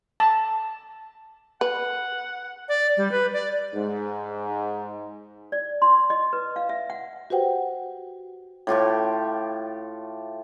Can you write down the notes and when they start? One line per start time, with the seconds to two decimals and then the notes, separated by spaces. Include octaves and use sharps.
0.20 A5
1.61 B4 F#5
2.69 D5
2.97 G3
3.12 B4
3.33 D5
3.74 G#2
5.52 D5
5.82 C6
6.10 D#5
6.33 B4
6.56 F5
6.69 E5
6.90 F#5
7.30 F#4 G4 B4 C5 F#5 G5
8.67 A2 F4 G4 C#6